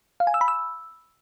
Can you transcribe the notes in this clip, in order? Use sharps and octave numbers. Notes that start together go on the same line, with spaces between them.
F5
G#5
E6
B5
E6